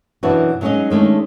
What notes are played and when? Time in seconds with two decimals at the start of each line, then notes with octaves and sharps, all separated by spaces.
0.23 F#2 B2 E3 D4 E4 F#4
0.61 F#3 G#3 C#4 D#4 G#4 D#5
0.90 D#3 G#3 A3 C#4 D4